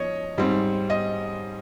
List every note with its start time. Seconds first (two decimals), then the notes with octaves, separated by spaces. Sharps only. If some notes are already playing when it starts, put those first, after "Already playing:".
Already playing: F3 C#5 D#5
0.38 G#2 G3 C4
0.90 D#5